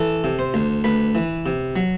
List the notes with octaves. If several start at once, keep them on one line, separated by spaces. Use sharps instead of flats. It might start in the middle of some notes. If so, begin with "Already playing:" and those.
Already playing: E3 A4
C3
C5
D2
D2 B4
E3
C3
F#3